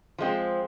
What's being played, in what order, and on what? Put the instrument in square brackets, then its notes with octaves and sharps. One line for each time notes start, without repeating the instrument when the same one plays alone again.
[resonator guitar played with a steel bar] F3 G#3 C4